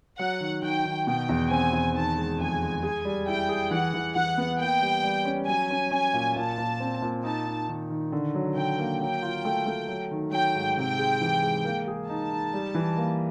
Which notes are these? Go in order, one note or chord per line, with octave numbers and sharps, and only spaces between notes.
F#3 F#5
D#3
D#3 G5
D#3
B2 G5
E2
C4 G#5
E2
D#3 A5
G#3
F2 G#5
G#3
G#4 G#5
G3
E4 G5
G#4
E3 F#5
E3
E3 F#5
B3
A#3 G5
G3
G3
C#4
F#3 G#5
C#4
C#4 G#5
A#2
A#2 A5
A#2
C4
A#2
D#4 A5
D#4
D#3
D#3
D3
F#3
D3 G5
A#3
F#3 G5
F4
A3
A3
F#3
D#3
F#3 G5
G#2
C3 G5
G#3
E3
G#3
A#3
G#4
D#4 A5
D#4
G3
E3
A#3